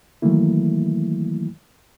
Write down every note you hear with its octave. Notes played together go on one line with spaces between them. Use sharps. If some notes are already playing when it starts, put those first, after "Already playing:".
D#3 E3 F#3 A3 A#3 E4